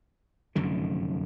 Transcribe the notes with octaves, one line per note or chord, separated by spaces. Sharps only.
F1 F#2 D3 D#3